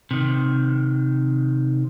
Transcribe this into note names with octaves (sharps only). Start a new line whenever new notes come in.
C3 D#3